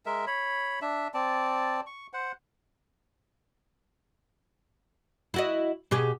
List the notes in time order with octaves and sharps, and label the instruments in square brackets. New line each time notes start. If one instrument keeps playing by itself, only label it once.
[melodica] G#3 A#4 E5
C#5 B5
D4 E5
C4 D5 A5
C#6
C5 F#5
[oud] E4 F#4 D#5
B2 G4 G#4